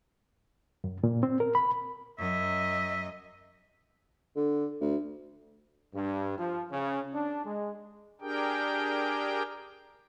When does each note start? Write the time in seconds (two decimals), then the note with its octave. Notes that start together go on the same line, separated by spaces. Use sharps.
0.84 F#2
1.04 A#2
1.23 C4
1.40 A#4
1.55 B5
2.19 F#2 D#5 E5
4.36 D3
4.81 D2
5.94 G2
6.38 F3
6.71 C#3
7.14 D4
7.45 G#3
8.21 D4 G4 G#4 A#4 G5